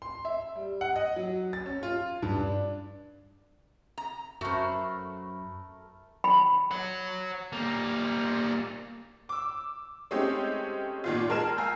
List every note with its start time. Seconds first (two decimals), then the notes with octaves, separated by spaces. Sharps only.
0.02 C6
0.25 E5
0.56 G3
0.81 F#5
0.96 D#5
1.16 F#3
1.53 A6
1.66 C#4
1.83 F4
2.22 G2
2.39 D4
3.98 A#5
4.41 F#2 A3 F#4 A#4 C5 B5
6.24 B5
6.71 C#5 F#5
7.53 G3 A#3
9.29 D6 E6
10.11 G#3 A3 C4 C#4 D#4 G4
11.04 A#2 D#3 F4
11.29 G#3 A#4 A5 F6 E7
11.57 F5 G#5 A#5 E6 G6